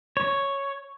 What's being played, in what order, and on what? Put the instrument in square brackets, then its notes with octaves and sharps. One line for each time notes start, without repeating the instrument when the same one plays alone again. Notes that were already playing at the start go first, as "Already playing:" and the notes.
[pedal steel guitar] C#5